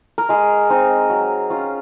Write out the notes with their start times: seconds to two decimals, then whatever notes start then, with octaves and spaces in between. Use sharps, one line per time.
0.18 A#4
0.29 G#3 G#4
0.70 C4 D#4
1.10 F#3
1.50 C#4 F4